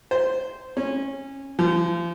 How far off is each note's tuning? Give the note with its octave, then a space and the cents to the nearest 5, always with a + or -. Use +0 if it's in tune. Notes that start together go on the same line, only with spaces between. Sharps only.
C5 -10
C#4 -20
F3 -35